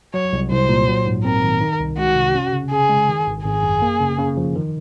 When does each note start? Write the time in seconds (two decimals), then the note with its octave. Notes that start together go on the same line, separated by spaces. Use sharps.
0.13 F#3 C#5
0.33 C2
0.51 C2 C5
0.69 A#2
0.87 F#3
1.06 G#2
1.24 C4 A#4
1.43 D#3
1.61 D#3
1.80 C2
1.98 G#3 F#4
2.16 C3
2.35 C#4
2.53 C#3
2.71 C#3 G#4
2.89 G#3
3.09 D#3
3.27 G#1
3.44 G#1 G#4
3.63 F#2
3.82 A#3
4.00 C#3
4.18 C#3
4.37 F3
4.55 D#3